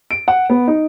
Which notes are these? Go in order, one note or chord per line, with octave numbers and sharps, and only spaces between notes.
D7
F#5
B3
D#4